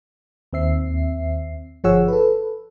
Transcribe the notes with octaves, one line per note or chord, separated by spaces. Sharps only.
D#2 C4 E5 C7
G1 F3 G#4 C#5 F#5 E6
A4 B4